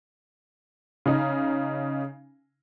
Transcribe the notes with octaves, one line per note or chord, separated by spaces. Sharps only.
C#3 D#4